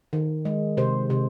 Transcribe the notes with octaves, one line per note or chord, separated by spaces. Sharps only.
D#3
G#3
C3 C5
C3